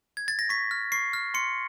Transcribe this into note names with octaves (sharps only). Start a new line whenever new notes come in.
G#6
A6
A#6
C#6 B6
F6
C#6 C7
F6
C6 C#7